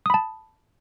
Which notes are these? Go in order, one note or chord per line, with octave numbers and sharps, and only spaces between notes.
A5 B5 D#6